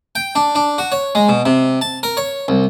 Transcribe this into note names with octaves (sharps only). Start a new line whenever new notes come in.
G5
D4
D4
F#4
C#5
G#3
B2
C3
A5
A#4
C#5
C2